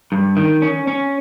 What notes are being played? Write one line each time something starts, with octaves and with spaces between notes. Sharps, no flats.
G2
D#3
C#4
C#4